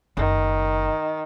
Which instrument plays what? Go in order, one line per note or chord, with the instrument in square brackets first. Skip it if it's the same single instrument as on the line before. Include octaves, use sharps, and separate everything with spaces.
[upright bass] F#1 [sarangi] D#3